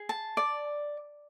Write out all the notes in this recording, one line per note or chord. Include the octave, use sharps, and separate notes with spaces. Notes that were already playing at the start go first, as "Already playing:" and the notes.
Already playing: G#4
A5
D5